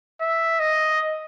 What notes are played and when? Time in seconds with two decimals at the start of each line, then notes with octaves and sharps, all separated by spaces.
0.21 E5
0.59 D#5